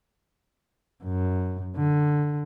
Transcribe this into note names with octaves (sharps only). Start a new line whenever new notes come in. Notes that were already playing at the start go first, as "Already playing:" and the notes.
F#2
D3